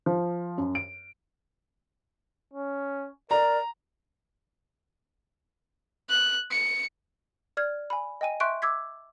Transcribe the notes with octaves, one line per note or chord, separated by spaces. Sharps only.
F3
F#2
D7
C#4
A#4 D5 A#5
F#6
C#7
D5 F6 G#6
G#5 B5
D#5 G5 G#5 D#7
E5 C6 C#6 F#6 G6 D7
D6 E6 G#6 B6